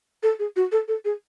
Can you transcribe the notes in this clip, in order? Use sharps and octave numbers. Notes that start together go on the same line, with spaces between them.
A4
G#4
F#4
A4
A4
G#4